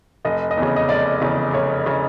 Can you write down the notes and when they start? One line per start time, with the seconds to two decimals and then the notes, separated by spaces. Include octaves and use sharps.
0.25 F1 D#5
0.51 D#5
0.57 E2 C#3
0.76 D#5
0.89 F1 D5
1.21 E2 C#3
1.54 F1 C#5
1.86 C#3